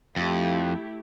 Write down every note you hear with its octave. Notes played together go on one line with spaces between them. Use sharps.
F2 A3 E4 G4